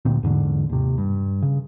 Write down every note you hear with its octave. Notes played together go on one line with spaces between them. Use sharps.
D2 A#2 C4
E2 G#2 D3 D4
D#2 C3
G2
C#3